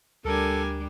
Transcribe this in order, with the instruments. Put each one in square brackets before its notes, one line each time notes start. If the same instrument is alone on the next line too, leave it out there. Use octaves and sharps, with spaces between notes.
[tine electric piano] D2 [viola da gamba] G3 D4 [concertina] A4 [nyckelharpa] A#4 G#5